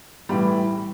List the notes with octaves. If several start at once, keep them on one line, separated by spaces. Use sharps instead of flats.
A2 E3 G3 B5